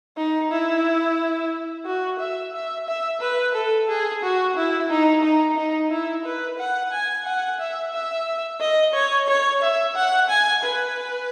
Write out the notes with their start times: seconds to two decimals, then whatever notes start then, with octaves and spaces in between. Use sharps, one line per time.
0.17 D#4
0.51 E4
1.85 F#4
2.19 E5
2.54 E5
2.87 E5
3.21 B4
3.54 A4
3.89 G#4
4.23 F#4
4.56 E4
4.90 D#4
5.23 D#4
5.57 D#4
5.91 E4
6.25 B4
6.59 F#5
6.92 G#5
7.25 F#5
7.60 E5
7.93 E5
8.60 D#5
8.94 C#5
9.28 C#5
9.62 E5
9.96 F#5
10.29 G#5
10.63 B4